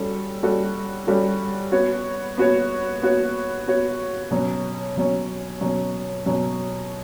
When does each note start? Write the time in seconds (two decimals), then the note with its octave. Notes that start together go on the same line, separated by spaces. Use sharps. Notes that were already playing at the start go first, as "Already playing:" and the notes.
Already playing: G3 C#4 F#4 A4
0.42 G3 C#4 F#4 A4
1.07 G3 C#4 F#4 A4
1.72 B3 F#4 C#5
2.37 B3 F#4 C#5
3.02 B3 F#4 C#5
3.67 B3 F#4 C#5
4.31 B2 F#3 C#4
4.96 B2 F#3 C#4
5.61 B2 F#3 C#4
6.25 B2 F#3 C#4